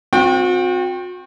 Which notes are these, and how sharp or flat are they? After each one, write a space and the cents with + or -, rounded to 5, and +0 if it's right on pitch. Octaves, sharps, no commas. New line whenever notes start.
C4 +0 F#4 -40 G5 +0